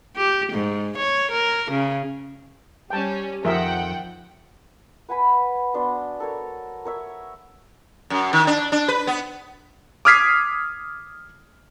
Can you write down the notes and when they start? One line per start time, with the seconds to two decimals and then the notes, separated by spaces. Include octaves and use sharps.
0.17 G4
0.52 G#2
0.97 C#5
1.32 A#4
1.71 C#3
2.90 G3 C#4 G5 A5
3.45 F2 D#3 F3 G#4 A#4 E5 F#5 G5
5.09 B4 F#5 G#5 B5
5.74 B3 D4 F#4 C6
6.20 A4 A#4 C#5
6.85 A#4 C#5 E5
8.10 F#2
8.33 D#3
8.47 D4
8.72 D4
8.88 B4
9.07 B3
10.05 D6 D#6 F6 G#6 B6 C7